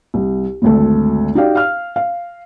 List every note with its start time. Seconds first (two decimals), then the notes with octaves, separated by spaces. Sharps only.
0.14 C2
0.62 G#1 D2 A4
1.35 D#4 F#4 G4 D5 F5 G5
1.55 F5 F6
1.96 F5